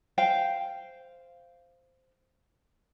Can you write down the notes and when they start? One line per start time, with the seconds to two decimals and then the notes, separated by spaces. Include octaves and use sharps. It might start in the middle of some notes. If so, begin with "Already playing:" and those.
0.18 C5 F5 G5